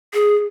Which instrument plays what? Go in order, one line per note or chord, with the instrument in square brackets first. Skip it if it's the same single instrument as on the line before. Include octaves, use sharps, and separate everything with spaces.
[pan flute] G#4